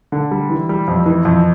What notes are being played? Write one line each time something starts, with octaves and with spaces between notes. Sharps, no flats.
D3
G3
E3
G3
F2
E3
F2